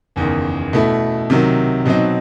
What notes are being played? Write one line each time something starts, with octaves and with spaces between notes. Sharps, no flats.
F#1 E2 D#3
B2 A3 E4
C3 D#3 F#3
B2 F#3 C4 D#4